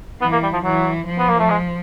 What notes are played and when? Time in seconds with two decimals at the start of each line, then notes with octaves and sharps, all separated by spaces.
0.21 E3 B3
0.32 A#3
0.43 G3
0.53 F3
0.64 E3 F#3
1.07 F3
1.18 B3
1.29 A#3
1.39 A3
1.50 G#3